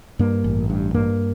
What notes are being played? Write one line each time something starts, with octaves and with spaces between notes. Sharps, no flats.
G2 A#3
A1
G2
G2 A#3